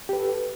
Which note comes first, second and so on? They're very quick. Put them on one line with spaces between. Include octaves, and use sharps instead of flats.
G4 B4 A4